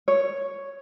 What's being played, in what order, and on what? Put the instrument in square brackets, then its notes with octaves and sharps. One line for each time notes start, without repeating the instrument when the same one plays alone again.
[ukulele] C#5